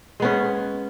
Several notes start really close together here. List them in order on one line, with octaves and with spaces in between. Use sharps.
G#3 B3 C#4